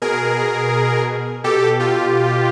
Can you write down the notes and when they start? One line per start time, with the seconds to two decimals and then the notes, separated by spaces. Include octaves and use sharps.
0.02 B2 G#4 A#4
1.44 B2 G4 A4
1.80 F4 G4